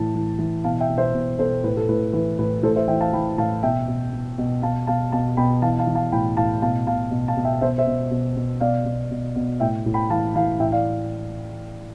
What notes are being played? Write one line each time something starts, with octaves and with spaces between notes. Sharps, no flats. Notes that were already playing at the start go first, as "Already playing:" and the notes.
Already playing: A2 E3 A5
E3
E3
B2 F5 A5
E5 G5
B2
C5 E5
B2
B2 A4 C5
A2 B4
A4
A2 B4
E3 B4
A2 B4
A2 A4 C5
C5 E5
E3 E5 G5
F5 A5
E3 G5 B5
A2 F5 A5
B2 E5 G5
B2
B2
B2
B2 F5 A5
B2 F5 A5
B2 F5 A5
B2 G5 B5
E3 F5 A5
F5 A5
E3
F5 A5
A2 G5 B5
A2 F5 A5
B2 F5 A5
B2 F5 A5
B2
F5 A5
B2
E5 G5
B2 C5 E5
C5 E5
B2
B2
B2
B2 D5 F5
B2
B2
B2
A2 E5 G5
A2
G5 B5
E3 F5 A5
E3 F5 A5
A2 E5 G5
D5 F5